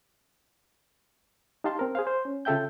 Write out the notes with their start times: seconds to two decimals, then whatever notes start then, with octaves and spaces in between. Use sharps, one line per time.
1.64 D#4 G4 F5 A5 C6
1.79 C4 A#4
1.95 G#4 C5 F5
2.07 C5
2.25 C#4
2.45 C#3 F4 A4 E5 G5 G6